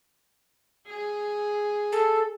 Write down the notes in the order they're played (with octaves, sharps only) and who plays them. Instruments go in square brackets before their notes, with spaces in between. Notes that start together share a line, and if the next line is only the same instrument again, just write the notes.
[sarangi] G#4
[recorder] A4